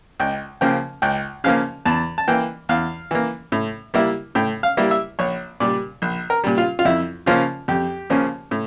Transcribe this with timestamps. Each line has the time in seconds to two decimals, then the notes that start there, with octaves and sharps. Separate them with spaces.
0.20 C#2 G5
0.61 C#3 F3 A#3 G5
1.02 C#2 G5
1.44 C#3 F3 A#3 F5
1.85 E2 A5
2.18 A5
2.28 E3 A#3 G5
2.69 E2 F5
3.11 E3 A#3
3.52 A2
3.94 G3 A#3 E4
4.35 A2 G5
4.63 F5
4.77 G3 A#3 E4
4.91 E5
5.19 A#1 C#5
5.60 A#2 G3 D5
6.02 A#1
6.30 A#4
6.44 A#2 G3
6.58 F4
6.79 F4
6.85 F2 E4
7.26 C#3 F3 A#3 C#4 F4
7.68 F2 G4
8.10 C#3 F3 A#3 C#4
8.51 A2